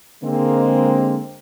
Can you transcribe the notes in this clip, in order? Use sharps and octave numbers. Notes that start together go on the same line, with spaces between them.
D3 G#3 A#3 C4